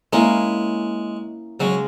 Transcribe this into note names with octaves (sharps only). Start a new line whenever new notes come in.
G#3 A#3 C#4 E4
C#3 F#3 G#3 C#4